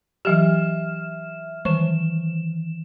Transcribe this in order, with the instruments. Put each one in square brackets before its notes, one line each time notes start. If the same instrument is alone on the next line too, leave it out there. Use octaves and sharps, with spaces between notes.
[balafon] E3 F#3 G4 [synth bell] E5 F6 E7
[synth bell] D#3 E3 E7 [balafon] C#6